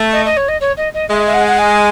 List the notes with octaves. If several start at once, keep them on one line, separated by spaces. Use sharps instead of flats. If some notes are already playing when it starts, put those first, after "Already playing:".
Already playing: A3
D#5
D#5
C#5
D#5
C#5
D#5
D#5
G#3 E5
E5
F#5
F#5
G#5